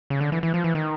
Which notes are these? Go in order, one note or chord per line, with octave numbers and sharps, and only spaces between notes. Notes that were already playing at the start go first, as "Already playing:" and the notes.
C#3
D3
E3
E3
F3
E3
D#3